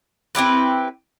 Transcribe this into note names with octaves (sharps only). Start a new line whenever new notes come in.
C4 E4 G4 B4